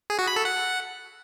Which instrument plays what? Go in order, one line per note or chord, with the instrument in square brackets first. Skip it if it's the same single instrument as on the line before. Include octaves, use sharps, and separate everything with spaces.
[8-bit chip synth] G#4
F#4
B5
A4
F#5